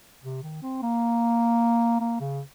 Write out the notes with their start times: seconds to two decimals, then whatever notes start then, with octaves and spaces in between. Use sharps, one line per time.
0.23 C3
0.43 D#3
0.62 C4
0.82 A#3
2.00 A#3
2.20 C#3